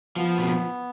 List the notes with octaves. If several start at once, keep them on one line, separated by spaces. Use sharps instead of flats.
F3 B3
B2